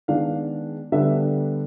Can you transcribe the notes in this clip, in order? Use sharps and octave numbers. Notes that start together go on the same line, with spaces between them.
D#3 G#3 B3 D4 F5
D3 G3 B3 D4 E5